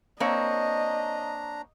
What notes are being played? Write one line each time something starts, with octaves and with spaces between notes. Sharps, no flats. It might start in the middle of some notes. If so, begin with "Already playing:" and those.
A#3 C4 D4 C#5 D#5 A#5